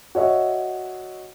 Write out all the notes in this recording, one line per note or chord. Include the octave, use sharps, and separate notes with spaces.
F#4 C#5 D#5 E5